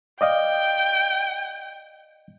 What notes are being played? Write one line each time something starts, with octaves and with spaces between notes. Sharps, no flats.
D5 D#5 F5 G5